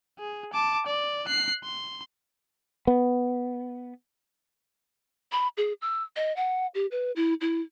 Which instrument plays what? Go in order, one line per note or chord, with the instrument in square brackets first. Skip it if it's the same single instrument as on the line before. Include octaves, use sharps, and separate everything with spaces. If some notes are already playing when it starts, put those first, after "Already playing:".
[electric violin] G#4
A5 D6
D5
F#6 C7
C6
[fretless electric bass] B3
[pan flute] B5
G#4
E6
D#5
F#5
G4
B4
E4
E4